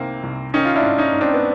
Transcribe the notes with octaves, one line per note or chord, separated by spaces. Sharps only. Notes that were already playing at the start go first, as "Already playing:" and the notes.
Already playing: C2 C3 D#3 A#3 C4
C2
D#3 C#4 D#4
F4
D4 E4
G#2
C#4 D#4
G#2
C4 D4
B3